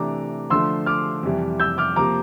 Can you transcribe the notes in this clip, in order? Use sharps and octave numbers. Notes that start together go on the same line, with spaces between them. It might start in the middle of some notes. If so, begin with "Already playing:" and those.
Already playing: C3 E3 A3 D4 A#5 D6
D3 F3 A3 C6 E6
D6 F6
F2 C3 E3 G3
E6 G6
D6 F6
C3 F3 A#3 A#5 D6